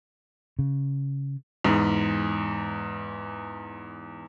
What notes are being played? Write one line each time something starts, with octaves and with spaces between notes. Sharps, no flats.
C#3
E2 G#2